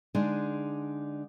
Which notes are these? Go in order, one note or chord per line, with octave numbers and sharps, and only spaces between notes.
D3 G#3 D4 D#4 G#4